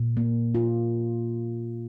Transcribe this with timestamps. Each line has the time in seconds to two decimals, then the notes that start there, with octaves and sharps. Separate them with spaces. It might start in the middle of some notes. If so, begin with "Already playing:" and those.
Already playing: A#2
0.17 A#3
0.55 F4